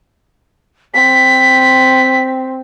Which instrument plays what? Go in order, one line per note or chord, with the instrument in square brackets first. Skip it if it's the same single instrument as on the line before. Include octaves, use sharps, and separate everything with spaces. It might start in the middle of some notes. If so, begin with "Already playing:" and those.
[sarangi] C4 [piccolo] B6